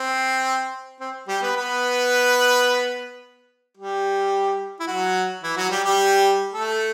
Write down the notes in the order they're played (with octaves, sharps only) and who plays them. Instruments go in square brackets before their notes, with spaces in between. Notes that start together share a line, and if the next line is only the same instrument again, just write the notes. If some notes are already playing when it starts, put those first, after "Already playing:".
Already playing: [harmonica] C4
C4
G3 G4
B3 B4
B3 B4
G3 G4
E4
F#3 F#4
E3 E4
F#3 F#4
G3 G4
G3 G4
A3 A4